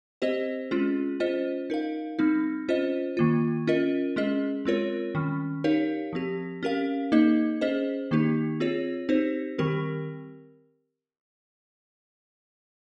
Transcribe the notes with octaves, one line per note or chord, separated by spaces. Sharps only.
C4 G4 C5 D#5
G#3 C#4 F4 G#4
C#4 F4 C5 D#5
D#4 A#4 F5
G3 C4 D#4
C#4 F4 C5 D#5
D#3 A#3 F4
C#4 F4 A#4 D#5
G#3 C#4 G#4 D#5
G#3 C4 F4 A#4 C#5
D#3 G3 C#4
D#4 G4 A#4 C#5 F5
F3 C4 G4
C#4 G4 A#4 F5
A#3 D#4 G#4 D#5
C#4 G#4 C5 D#5
D#3 A#3 D#4 G4
C4 F4 G#4 C#5
C4 D#4 G4 C5
D#3 G3 C4 G4 A#4